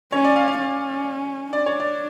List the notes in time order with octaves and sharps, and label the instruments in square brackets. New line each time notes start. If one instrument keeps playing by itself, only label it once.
[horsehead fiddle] C#4 [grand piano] C#5
[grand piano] D5
F5
F5
[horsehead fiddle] C#4
[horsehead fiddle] D4 [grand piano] D5
[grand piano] C#5
D5